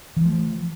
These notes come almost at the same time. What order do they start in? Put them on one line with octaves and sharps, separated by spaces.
E3 F3 A3